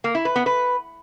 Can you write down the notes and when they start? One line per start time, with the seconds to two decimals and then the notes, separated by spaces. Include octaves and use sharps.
0.04 A#3
0.15 E4
0.25 B4
0.36 B3
0.46 B4